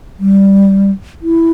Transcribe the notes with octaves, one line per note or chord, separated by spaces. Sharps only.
G3
E4